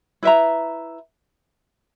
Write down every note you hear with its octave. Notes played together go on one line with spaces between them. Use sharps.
E4 B4 E5 A#5